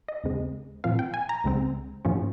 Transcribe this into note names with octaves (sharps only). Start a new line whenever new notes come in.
D#5
D#2 C#3 G#3 C4
A#2 F3 C4 F5
G5
G#5
A#5
C#2 C#3 G#3 C4
G#2 F3 A#3 C#4